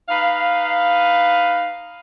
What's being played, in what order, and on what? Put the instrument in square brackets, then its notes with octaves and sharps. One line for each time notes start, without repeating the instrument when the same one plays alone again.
[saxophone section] D#4 B4 F5